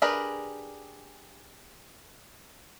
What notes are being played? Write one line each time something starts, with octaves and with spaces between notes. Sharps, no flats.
D4 G4 G#4 A#4 B4